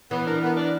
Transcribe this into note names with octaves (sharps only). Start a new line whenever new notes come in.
E3 B3
D4 A#4
B3
D4 A#4